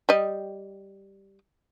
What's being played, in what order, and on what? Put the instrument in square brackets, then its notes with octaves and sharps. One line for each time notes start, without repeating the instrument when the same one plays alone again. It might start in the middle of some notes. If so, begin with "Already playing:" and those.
[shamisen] G3 D#5